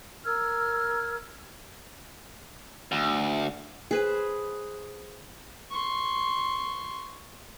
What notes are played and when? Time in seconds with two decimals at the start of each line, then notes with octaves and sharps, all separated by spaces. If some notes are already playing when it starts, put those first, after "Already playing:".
0.25 A#4 E6 F6 G#6
2.92 D2
3.91 G#4 B4 C5
5.71 C6 C#6